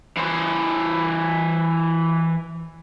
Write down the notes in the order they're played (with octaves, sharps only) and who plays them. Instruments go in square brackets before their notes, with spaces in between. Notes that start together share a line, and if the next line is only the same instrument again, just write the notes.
[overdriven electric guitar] E3 C5